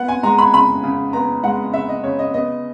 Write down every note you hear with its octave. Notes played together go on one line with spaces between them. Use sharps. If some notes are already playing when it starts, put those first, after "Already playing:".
Already playing: B3 F#5
G#5
G#3 A#5
B5
C#3 B5
C#3
B3 A#5
G#3 F#5
C#3 E5
D#5
C#3 C#5
D#5
B3 D#5